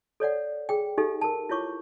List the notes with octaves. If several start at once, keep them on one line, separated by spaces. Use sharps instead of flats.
A4 C#5 D5 F#5
G#4 G5
D#4 G4 A4 E5
A#4 A5
E4 F4 C#5 C#6 D6